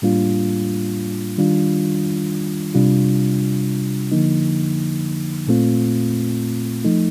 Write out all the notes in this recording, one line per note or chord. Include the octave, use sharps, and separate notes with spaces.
A2 G3 A#3 D4 F4
D#3 G3 D4 F4
C3 G3 D4 F4
D3 F3 A#3 D#4
A#2 A3 C4 F4
F3 A3 D#4